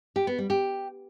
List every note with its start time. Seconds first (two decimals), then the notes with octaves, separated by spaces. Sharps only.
0.16 G4
0.27 B3
0.38 G3
0.50 G4